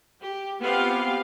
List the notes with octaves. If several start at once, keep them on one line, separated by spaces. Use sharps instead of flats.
G4
B3 C4 F4 G4 F5